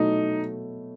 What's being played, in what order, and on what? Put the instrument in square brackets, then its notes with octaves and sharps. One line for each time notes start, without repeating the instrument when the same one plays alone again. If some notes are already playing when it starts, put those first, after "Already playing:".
Already playing: [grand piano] B2 F#3 A3 E4 [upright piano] D#4